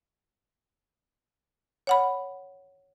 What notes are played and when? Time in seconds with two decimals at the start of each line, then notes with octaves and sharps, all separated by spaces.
1.87 C#5 F#5 B5